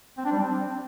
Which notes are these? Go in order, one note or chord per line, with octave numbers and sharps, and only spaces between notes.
C4
D4
G3
C4